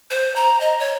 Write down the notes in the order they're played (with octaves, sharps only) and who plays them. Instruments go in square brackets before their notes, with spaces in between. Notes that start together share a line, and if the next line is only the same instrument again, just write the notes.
[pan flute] C5
A#5
D#5
C#5